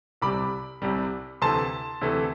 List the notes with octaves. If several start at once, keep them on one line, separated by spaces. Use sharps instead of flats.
C2 C3 G3 B5 D6
C2 C3 G3
D2 C3 E3 A3 A5 C6
D2 C3 E3 A3